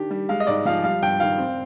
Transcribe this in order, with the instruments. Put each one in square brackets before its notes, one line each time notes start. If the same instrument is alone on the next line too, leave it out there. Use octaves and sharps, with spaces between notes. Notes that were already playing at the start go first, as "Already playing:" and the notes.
Already playing: [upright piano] D#3 D4 G4
G3
[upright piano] G#3 [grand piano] F5
[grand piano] D#5
[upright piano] G#2 [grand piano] D5
[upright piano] F3 [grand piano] F5
[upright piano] G3 [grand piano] F5
[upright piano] G2 [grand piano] G5
[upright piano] D#3 [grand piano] F5
[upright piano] C4